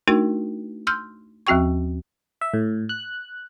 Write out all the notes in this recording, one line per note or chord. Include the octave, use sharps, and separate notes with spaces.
A3 D4 D#4 F#4 A#4
C6 E6 F6 G6
D#2 F3 C4 F#4 G5 C#6
E5
A2
F#6